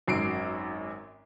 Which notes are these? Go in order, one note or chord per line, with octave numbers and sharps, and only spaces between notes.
G#1 F#2 C7 D7